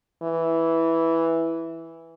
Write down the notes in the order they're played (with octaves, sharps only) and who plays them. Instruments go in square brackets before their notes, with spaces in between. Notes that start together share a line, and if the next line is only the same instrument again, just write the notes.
[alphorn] E3